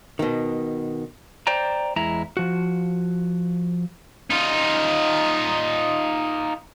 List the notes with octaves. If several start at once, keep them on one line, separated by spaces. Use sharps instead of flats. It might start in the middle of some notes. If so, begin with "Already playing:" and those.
B2 D#3
C5 D5 G5 A#5
E2 G#3 E4 A#5
F3 F#4
D#4 F4